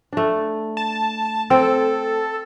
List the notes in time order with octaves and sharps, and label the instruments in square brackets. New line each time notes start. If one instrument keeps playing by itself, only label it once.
[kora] A3 D4
[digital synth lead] A5
[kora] C4 G5 [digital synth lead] A4